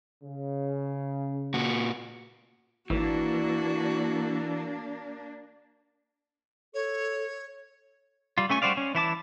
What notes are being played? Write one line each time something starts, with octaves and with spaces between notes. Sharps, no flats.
C#3
A#2 F#4
G#1 E3 A#3 D4 F#4
A4 C#5
G3 F4
A3 C#4 G#5 C#6
G3 F#4 C5 D5 F5
C#4
E3 E4 A5 D6